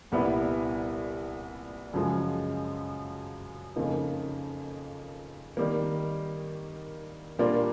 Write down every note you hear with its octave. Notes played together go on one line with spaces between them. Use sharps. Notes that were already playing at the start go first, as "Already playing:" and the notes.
C2 A#2 G3 B3 E4
F#2 C#3 F3 G#3
F2 C#3 F3 A#3 D#4
D#3 G3 A#3
A#2 G3 A#3 D4 F4